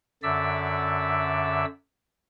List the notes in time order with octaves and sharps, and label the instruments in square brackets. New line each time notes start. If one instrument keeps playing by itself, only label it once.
[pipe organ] F#2 D3 D5 E5 E6